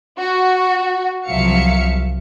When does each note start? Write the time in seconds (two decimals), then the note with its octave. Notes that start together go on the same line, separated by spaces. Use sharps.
0.18 F#4
1.26 C2 F3 F#3 E5 F5 C#7